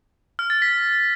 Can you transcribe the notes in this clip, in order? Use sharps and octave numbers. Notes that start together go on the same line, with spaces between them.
F6
A6
B6